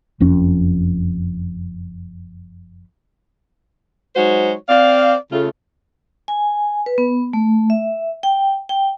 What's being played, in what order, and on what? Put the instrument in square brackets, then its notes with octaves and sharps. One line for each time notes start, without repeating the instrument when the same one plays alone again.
[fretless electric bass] F#1 F2 C#4
[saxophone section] F#3 G#3 D#4 F#4 C5 C#5
C4 D5 F5
C#3 A3 F4
[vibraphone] G#5
B4
B3
A3
E5
G5
G5